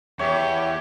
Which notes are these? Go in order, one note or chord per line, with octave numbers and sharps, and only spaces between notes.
E2 G4 C#5 E5